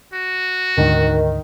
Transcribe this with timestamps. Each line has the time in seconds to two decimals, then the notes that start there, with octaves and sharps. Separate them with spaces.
0.13 F#4
0.78 D2 G#2 D3 D#3